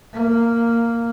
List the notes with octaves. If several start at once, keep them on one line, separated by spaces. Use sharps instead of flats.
A#3